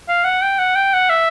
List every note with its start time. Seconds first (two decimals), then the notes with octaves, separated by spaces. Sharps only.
0.08 F5
0.25 F#5
0.42 G5
0.59 F#5
0.76 G5
0.94 F#5
1.10 E5